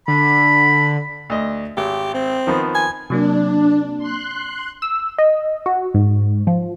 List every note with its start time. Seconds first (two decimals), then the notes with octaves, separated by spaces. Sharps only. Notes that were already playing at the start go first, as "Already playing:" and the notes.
0.08 D3 B5
1.30 D2 D#5
1.77 G#1 G4
2.14 C4
2.47 D#3 F3 B3
2.75 G#5
3.10 C3 F#3 A#3 D4
3.98 C6 F#6
4.82 E6
5.18 D#5
5.66 F#4
5.94 G#2
6.47 F3